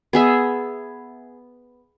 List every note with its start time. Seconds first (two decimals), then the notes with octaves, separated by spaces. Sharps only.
0.13 B3 G#4 E5